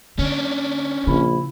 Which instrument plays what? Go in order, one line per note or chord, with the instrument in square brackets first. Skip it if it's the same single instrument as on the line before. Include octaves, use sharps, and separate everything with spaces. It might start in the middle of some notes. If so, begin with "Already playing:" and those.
[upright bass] D3 [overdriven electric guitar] C#4 D4
[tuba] A#1 [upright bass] C#3 [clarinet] E4